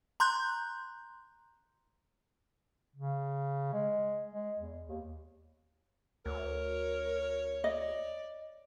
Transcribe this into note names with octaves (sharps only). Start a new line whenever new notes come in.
A#5 C6 F#6 G6
C#3
G#3
G#3
E2
D#2
D2 A#4 C#5
D5 D#5